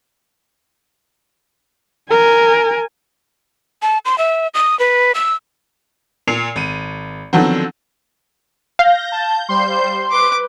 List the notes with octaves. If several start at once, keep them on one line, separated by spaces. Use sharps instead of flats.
A#4 G#5
A5
C6
E5
D#6
B4
E6
A#2 C7 C#7 F7
G#1 D#7
D3 D#3 F3 F#3 B3 C4
F5 G6 A#6
A5 G6
G3 C5 C6 G6
B4 D6